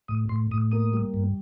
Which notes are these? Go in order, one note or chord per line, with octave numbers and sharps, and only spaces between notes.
A2 D#6
A2 C6
A2 D#6
A#3 D#6
G3
G2